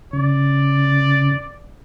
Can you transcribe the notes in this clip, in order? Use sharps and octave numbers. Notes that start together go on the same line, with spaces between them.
C#3 D5